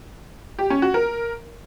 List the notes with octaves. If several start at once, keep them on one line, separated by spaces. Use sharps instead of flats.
G4
C#4
F#4
A#4